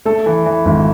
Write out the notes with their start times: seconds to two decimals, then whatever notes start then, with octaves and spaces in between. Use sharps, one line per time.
0.05 A3 A4
0.26 E3
0.46 E3
0.65 G#1